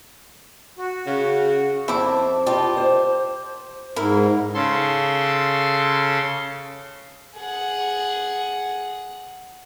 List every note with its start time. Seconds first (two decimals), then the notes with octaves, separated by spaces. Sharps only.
0.78 F#4
1.07 C#3 C#4 G#4
1.88 F2 C4 E4 A5 D6
2.46 F4 G4 D#5 A5
2.77 C5
3.96 G#2 E4 A#4
4.54 C#3 A4 C6
7.38 G#4 F#5